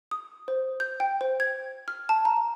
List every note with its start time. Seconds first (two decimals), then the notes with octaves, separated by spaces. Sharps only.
0.11 D#6
0.48 C5
0.80 G6
1.00 G5
1.21 C5
1.40 G#6
1.88 F6
2.09 A5
2.25 A#5